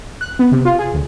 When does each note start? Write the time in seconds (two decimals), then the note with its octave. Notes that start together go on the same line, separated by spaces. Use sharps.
0.21 F#6
0.39 B3
0.52 C3
0.65 F4
0.79 G#4
0.94 D2